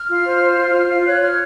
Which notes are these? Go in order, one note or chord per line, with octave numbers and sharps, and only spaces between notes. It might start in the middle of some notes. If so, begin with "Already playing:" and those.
Already playing: F6
F4
C5
C5
F4
F4
F4
C#5 F#6
C#5 F6